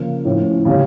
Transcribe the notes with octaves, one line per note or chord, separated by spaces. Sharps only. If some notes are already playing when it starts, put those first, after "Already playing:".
Already playing: C#3 F3 A#3
A2 F3 C#4
C#3 G3 C#4